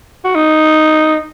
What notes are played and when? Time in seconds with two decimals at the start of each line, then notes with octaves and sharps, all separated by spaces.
0.25 F#4
0.35 D#4